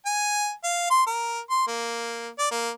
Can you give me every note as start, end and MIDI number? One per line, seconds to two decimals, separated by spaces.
0.06 0.51 80
0.64 0.88 77
0.90 1.03 84
1.07 1.40 70
1.50 1.63 84
1.67 2.28 58
2.39 2.48 74
2.52 2.70 58